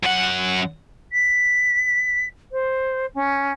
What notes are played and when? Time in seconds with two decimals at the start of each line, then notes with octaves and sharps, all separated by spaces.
0.04 F#2 F#5
1.12 B6
2.52 C5
3.14 C#4